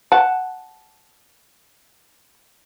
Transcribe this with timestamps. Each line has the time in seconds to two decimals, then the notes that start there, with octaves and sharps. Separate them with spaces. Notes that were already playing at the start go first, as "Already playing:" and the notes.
0.12 F#5 A5